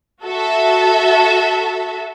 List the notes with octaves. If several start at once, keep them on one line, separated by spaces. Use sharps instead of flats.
F#4 A4 E5